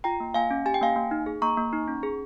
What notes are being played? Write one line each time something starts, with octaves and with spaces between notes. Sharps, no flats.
F4 G5 A#5
A#3
A#3 F5 G#5
C#4
G4 G#5
G5
A#3 F5 G#5
A#3
D#4
G#4
A#3 A#5 C#6
A#3
D#4
C#4
G#4